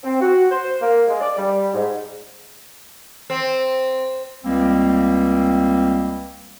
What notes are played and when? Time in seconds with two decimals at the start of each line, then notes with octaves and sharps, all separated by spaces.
0.03 C4
0.21 F#4
0.51 C5
0.81 A#3
1.08 G#3
1.20 D5
1.37 G3
1.74 G#2
3.30 C4
4.44 C#2 G3 A#3 C4